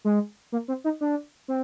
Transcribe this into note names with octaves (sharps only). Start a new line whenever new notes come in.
G#3
A#3
C4
D#4
D4
C4